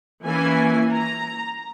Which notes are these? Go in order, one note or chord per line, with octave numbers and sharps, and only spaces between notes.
E3 A#3 C#4 E4 G#5
A#5